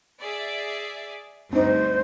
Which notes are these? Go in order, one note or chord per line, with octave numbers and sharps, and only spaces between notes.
G#4 D5 E5
D2 G2 C4 D#4 C5